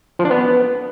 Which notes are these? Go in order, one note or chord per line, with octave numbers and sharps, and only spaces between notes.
F3
D4
B3